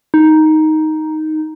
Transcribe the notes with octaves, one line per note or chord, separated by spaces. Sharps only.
D#4